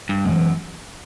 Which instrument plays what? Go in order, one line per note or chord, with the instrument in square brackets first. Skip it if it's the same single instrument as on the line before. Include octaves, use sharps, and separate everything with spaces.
[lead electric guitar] G2
[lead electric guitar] F#2 [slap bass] E3 G#3 B3